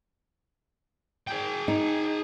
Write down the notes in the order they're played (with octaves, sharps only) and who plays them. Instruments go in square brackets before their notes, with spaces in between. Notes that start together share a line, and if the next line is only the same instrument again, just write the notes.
[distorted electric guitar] G#4 G5
[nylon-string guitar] D#4